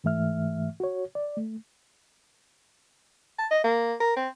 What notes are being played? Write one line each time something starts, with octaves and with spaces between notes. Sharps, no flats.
G#2 E3 A3 E5 F6
F#4 C#5
D5
A3
A5
D#5
A#3
A#4
C4